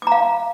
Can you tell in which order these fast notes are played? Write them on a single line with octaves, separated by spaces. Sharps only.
D6 A#5 F5